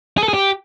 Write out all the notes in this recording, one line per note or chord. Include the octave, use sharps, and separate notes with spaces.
G#4
A4
G#4
G4